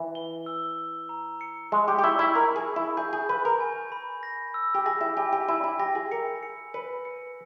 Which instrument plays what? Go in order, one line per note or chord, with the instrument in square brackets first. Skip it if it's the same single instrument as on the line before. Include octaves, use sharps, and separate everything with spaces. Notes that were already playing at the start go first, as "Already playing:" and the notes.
Already playing: [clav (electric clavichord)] E3
[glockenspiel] G7
E6
E6
A#5
C#7
[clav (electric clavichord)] G#3 [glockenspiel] C#6
[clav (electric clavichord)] G4
G4
[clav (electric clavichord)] E4 [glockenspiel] C#6
[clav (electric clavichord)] E4
[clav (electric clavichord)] A#4 [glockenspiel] B5
[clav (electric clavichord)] G#4
[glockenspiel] B5
[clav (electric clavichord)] E4
[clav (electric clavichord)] G#4 [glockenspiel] G6
[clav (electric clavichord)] G#4
[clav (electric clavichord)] B4 [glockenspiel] B5
[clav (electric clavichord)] A#4
[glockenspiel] G#5
B5
A#6
E6
[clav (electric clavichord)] G4
[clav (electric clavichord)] G#4 [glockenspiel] A#6
[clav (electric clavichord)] E4
[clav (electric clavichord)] G4 [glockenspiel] G#5
[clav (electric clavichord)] G4
[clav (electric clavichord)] E4 [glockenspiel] G#5
[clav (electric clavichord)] E4
[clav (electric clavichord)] G4 [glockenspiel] A#6
[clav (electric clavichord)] G#4
[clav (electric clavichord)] A#4 [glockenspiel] C#7
[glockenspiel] C#7
[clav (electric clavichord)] B4 [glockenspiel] C#7
[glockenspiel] C#7